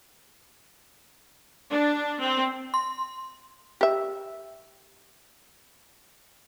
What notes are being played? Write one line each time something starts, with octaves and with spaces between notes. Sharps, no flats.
D4
C4
C6
G4 E5